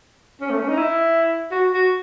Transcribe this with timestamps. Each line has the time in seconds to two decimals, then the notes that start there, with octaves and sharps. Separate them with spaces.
0.41 C#4
0.50 A3
0.60 C#4
0.68 D#4
0.77 E4
1.51 F#4
1.73 F#4